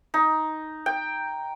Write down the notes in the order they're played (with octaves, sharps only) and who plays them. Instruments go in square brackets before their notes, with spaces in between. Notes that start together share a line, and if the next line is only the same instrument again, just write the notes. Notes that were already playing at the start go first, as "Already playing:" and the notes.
[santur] D#4
G5